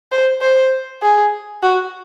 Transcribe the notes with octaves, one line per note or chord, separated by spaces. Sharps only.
C5
C5
G#4
F#4